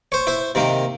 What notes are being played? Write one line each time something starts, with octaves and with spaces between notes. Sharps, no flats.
C5 C#5
E4 C5
C3 D#3 A#3